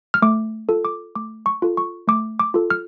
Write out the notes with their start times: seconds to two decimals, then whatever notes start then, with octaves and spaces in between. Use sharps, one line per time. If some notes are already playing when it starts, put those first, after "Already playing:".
0.14 F6
0.22 A3 D6
0.69 F4 A4
0.85 D6
1.15 A3 D6
1.46 C#6
1.62 F4 A4
1.77 C#6
2.08 A3 D6
2.40 D6
2.54 F4 A4
2.70 F6